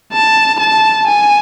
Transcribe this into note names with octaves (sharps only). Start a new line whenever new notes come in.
A5
A5
G#5